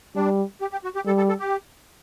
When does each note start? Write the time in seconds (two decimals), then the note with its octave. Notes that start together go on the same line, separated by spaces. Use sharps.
0.16 G3 D4
0.61 G4
0.72 G4
0.84 F#4
0.95 G4
1.06 G3 A4
1.17 A4
1.29 A4
1.40 G4